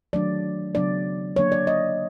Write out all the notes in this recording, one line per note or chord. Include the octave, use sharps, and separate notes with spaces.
D#3 F#3 A3 D4 D5
C#3 F#3 B3 D4 D5
D3 F#3 A#3 D4 C#5
D5
D#5